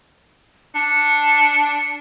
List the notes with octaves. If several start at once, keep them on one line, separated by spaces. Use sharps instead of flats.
D4 C#7